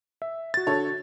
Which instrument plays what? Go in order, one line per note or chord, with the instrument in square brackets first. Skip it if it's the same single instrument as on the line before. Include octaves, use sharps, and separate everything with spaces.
[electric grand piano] E5
F#4 A6
[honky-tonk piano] D3 A4 C#5